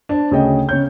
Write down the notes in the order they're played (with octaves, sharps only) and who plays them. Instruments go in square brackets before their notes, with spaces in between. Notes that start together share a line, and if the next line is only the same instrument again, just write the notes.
[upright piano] D4 C5
D2 C#3 G#4 C#5 D#5 G5
C#3 C#5 G6